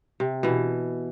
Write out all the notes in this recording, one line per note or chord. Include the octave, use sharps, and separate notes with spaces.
C3
B2 E3